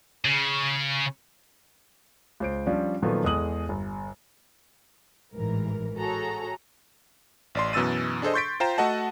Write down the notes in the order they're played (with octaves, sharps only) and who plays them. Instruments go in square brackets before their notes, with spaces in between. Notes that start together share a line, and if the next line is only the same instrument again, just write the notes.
[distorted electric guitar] C#3
[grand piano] C#2 C5 D7
F3 G3 C#4 D4
A#2 D#3 F3 F#3 A3 B3
E2 G#3 A4 D#6 F#7
G1
[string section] A1 G#2 E3 A#4
F#4 G#4 A4 C#5 A#5
[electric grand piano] A1 D5 C6
F#2 B2 E3 E6 A6 D#7
D4 G#4 A4 C5 D#5
C6 C#6 G6 A6 B6 D7
F4 C5 G5 A#5 E7
A3 F#4 A4 D#5 F#5 A5